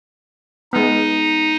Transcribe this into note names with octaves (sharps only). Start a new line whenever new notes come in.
G#3 B3 D#4